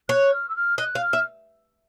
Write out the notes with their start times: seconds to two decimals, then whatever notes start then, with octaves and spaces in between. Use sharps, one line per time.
0.09 C#5 F#6
0.32 F6
0.48 E6
0.56 F6
0.78 D#5 F#6
0.95 F5
1.01 F6
1.13 E5